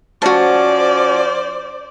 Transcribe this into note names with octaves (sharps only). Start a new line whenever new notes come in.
F3 C#4 F#4 C5 D5 A5